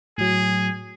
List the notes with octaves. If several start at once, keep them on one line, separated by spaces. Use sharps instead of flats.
A2 F#3 G#4